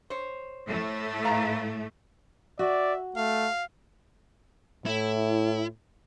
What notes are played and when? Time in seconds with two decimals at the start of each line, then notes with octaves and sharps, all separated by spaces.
0.10 C5 C#5
0.68 A2 A3
1.24 B4 F5 A#5
2.59 F#4 D5 E5
3.16 A3 F5
4.86 A2 E4